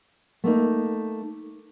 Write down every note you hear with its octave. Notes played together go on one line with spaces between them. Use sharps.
A3 A#3 D#4